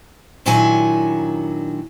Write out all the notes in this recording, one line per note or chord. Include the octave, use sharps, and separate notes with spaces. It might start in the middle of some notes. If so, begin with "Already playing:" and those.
A#2 D#3 F#3 D4 E4 G#5